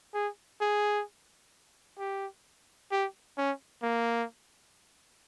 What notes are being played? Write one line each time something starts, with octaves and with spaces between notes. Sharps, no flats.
G#4
G#4
G4
G4
C#4
A#3